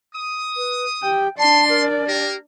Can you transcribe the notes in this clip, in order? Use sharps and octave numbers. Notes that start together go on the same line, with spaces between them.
D#6
B4
G4 G5
D4 D5 A5 C6
A#4
A#3 G4 A#4